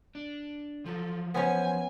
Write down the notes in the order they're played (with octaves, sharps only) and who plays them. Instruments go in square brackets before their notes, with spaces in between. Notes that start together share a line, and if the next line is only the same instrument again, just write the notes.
[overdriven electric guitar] D4
[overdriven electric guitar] F3 F#3 [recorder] A4
[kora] B3 C#4 [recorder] C5 [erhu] G#5